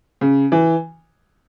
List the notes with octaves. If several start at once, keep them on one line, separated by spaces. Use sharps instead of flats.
C#3
E3